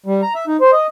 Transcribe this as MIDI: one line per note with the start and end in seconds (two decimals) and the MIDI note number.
0.06 0.21 55
0.22 0.33 82
0.35 0.45 76
0.47 0.57 63
0.61 0.71 72
0.73 0.87 75